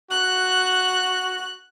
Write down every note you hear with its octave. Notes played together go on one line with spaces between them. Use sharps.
F#4 F#6